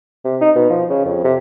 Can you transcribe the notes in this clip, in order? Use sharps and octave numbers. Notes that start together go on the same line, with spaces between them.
C3
D#4
B2
F3
C#3
F2
C3